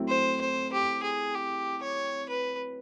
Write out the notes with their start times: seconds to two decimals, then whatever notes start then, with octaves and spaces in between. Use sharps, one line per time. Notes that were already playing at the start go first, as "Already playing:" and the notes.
Already playing: F#3 A3 C4 E4
0.09 C5
0.41 C5
0.73 G4
1.03 G#4
1.35 G4
1.83 C#5
2.29 B4